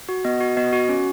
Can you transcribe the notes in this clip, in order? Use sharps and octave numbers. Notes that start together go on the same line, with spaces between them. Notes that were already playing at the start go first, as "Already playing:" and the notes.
F#4
B3 D#5
F#4
B3 D#5
F#4
C#4